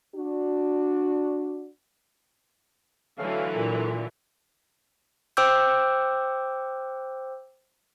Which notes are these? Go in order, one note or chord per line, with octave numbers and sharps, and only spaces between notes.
D4 F#4
D3 E3 F#3 A3 C#4 F5
A#2
C5 G5 D6 E6 G6